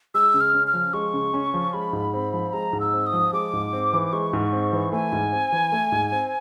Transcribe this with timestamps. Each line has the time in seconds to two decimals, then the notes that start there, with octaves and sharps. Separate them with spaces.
0.14 G#3 E6
0.34 C#3
0.41 F6
0.54 C#4
0.67 F6
0.74 F3
0.93 G#3 C#6
1.13 C#3
1.34 C#4
1.54 F3
1.74 G#3 B5
1.93 G#2
2.13 C4
2.33 F3
2.53 G#3 A#5
2.73 G#2
2.80 E6
2.93 C4
3.07 D#6
3.13 F3
3.33 G#3 D6
3.53 G#2
3.73 C4
3.93 E3
4.13 G#3 C#6
4.33 G#2
4.52 C4
4.72 E3
4.92 A3 G#5
5.12 G#2
5.32 C4
5.52 E3
5.72 A3
5.92 G#2
6.12 C4